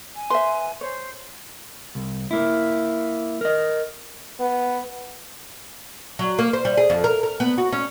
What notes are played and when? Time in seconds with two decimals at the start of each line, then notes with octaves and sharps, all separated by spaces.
0.16 G#5
0.30 B4 C5 E5 C6
0.81 C5 C#5
1.95 C2
2.31 A#3 E4
3.41 A#4 D#5
4.40 B3
6.19 F#3
6.39 A#3
6.53 C5
6.65 G3
6.77 G#4
6.90 F2
7.04 A#4
7.23 A#4
7.40 B3
7.58 F#4
7.72 C#4